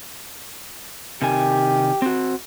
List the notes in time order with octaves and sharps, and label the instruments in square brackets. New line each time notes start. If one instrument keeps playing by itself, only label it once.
[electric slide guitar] C3 D#3 G#5 [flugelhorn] G4
[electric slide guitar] C4 F#4